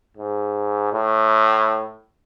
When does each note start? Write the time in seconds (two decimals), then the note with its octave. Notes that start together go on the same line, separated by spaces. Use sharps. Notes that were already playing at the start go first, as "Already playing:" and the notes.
0.17 G#2
0.93 A2